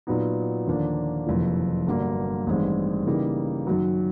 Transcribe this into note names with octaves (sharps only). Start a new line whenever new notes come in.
A#2 F#3 B3 D#4
D#2 D3 F3 A#3 D4
F#1 F2 C3 E3
G1 G2 D3 F#3 A#3
A1 G2 D#3 G#3 C4
C#3 E3 G3 A#3 D#4
F#2 D#3 F#3